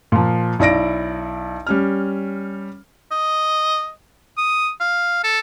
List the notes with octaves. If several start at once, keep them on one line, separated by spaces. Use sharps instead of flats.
A#2 F3
B1 E4 D5 A#6 D7
G3 C#4 F6
D#5
D#6
F5
A4